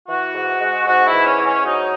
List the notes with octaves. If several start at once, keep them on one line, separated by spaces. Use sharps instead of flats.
E3 F#4
G#2
G#3
G#2 F#4
E4
E3
C#4
G#2
C#4
F#3 D#4